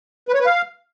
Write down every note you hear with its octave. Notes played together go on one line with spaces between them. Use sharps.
B4
C#5
B4
F5